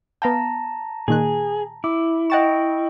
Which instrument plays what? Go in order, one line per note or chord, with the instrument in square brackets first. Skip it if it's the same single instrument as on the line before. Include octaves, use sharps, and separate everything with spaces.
[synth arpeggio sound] B3 F5 G5 [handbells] A5 A#5 A#6
[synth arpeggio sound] A#2 D#3 F#6 [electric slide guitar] G#4
[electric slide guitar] E4 [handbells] D6
[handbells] D#5 G5 C#6 [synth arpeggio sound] F#5 A6 E7